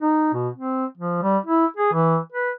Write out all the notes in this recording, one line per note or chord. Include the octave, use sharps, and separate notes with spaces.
D#4
B2
C4
F3
G3
E4
G#4
E3
B4